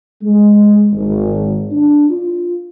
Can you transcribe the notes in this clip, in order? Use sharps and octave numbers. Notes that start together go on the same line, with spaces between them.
G#3
G#1
D4
F4